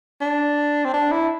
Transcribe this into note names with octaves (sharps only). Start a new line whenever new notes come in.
D4
C4
D4
E4